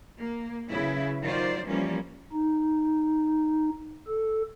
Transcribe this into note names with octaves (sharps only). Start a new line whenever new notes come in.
A#3
C#3 F#3 E4 B4
D#3 F#3 F4 C5 D5
E3 F3 G3 A#3 C#4
D#4
A4